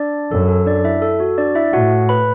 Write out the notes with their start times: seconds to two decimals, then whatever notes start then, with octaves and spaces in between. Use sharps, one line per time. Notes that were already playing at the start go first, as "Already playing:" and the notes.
Already playing: D4 D5
0.31 F#2 A4
0.49 A4
0.66 D4 D5
0.84 E4 E5
1.02 A4
1.20 F#4
1.38 D4 D5
1.55 E4 E5
1.73 A2 F#4 F#5
2.09 B4 B5